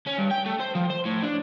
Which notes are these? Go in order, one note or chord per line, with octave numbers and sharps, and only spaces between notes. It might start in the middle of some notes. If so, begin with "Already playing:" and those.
C#4
G2
G5
A3
C5
F3
C5
A2
D4